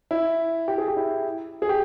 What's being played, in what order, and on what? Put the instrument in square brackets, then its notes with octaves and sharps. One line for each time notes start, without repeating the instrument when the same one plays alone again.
[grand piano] E4
G4
G#4
G4
E4
G#4
G4